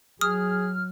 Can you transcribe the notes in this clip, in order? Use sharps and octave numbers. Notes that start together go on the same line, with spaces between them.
F#3 G#4 D#6 F6